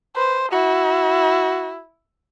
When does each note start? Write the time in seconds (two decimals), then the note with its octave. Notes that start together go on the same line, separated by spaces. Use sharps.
0.16 B4 C5
0.52 E4 F#4